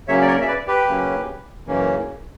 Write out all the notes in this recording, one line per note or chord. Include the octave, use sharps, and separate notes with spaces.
C#3 F#3 A#3 C#4 C#5 E5
D5
A#4 C#5
E5
B4 D5
G4 B4
C#3 F#3 A#3 C#4
F#2 C#3 E3 A#3 C#4